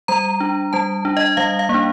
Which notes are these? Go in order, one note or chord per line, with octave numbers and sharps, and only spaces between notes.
G3 A#5
D4
G3 A5
D4
D#5
G3 F5
F5
A#3
D4